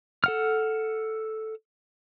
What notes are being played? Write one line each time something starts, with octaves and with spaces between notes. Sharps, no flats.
A4 F#5 F6